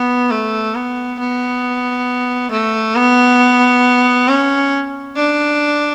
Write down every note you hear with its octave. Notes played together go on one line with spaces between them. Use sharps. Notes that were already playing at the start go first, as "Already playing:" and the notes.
Already playing: B3
A3
B3
B3
A3
B3
C#4
D4